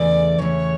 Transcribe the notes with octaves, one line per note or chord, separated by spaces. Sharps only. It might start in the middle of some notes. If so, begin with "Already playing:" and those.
Already playing: E2 C#3 E3 A3 D5
E2 C#3 E3 A3 C#5